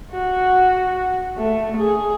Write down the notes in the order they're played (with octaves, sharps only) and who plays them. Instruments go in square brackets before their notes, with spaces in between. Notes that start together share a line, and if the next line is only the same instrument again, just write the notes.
[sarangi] F#4
A3
G#4